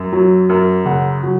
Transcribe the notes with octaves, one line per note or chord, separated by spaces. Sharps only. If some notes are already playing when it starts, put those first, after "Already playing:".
Already playing: F#2
F#3
F#2
C#3 F#5
F#3